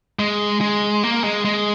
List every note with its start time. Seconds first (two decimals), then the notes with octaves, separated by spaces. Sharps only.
0.19 G#3
0.61 G#3
1.04 A#3
1.24 G#3
1.45 G#3